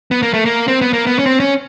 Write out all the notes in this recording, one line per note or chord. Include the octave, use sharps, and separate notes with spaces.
B3
A#3
A3
A#3
C4
B3
A#3
B3
C#4
C4
C#4